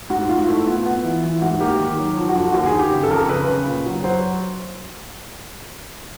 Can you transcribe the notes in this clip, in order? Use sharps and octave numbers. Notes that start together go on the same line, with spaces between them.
G#2 F#4
G#2 F4
A3 E4
B3 F4
B3
E3
E3
G#2 F#4
A#3 G4
D#3
F#3
F3
F#4
D3
F#4
D#2 F#4
G#4
D#2
G4
C#3
A4
F2 A#4
C#3 B4
C#3
A#2
F#3
F#3 C5